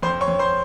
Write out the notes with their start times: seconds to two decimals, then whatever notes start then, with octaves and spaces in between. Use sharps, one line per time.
0.03 F2 C5 C6
0.21 C#5 C#6
0.28 F2
0.39 C5 C6